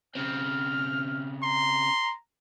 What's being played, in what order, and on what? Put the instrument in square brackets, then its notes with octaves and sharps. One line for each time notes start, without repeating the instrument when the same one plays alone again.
[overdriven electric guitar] C#3 C4 [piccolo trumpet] F6
[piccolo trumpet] A#5 [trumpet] C6